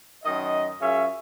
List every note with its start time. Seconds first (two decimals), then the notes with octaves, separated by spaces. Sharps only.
0.24 F#2 D#3 D#5
0.81 F#2 C#4 F4 G#4 E5